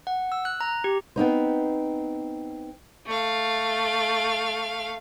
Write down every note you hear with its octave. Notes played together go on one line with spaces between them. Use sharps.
F#5
E6
F#6
A#5
G4
B3 C4 D#4 C5
A3 F5